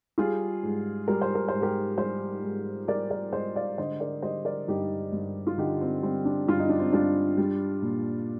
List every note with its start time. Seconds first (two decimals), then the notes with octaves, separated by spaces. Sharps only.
0.18 G3 F4 G#4
0.63 G#2
1.08 G3 A#4
1.21 C5
1.35 A#4
1.48 G#2 C5
1.62 G4 A#4
1.98 G3 G#4 C5
2.43 G#2
2.88 G3 A#4 D5
3.10 A#4 D5
3.33 G#2 C5 D#5
3.55 D5 F5
3.78 D3 C5 D#5
4.00 A#4 D5
4.22 G3 C5 D#5
4.45 A#4 D5
4.68 G2 D#4 G4
5.12 G2
5.47 F4
5.58 D3 D#4 G4
5.81 C4
6.03 G3 C4
6.25 D4
6.48 G2 F4
6.59 D#4
6.69 D4
6.79 C4 D#4
6.92 G2 D4 F4
7.37 G3
7.82 A#2